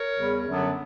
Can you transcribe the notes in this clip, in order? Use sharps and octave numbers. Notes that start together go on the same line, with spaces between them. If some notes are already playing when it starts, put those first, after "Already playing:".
Already playing: A#4 C#5
E2 C#3 G3
F#2 D3 F#3 B3 D4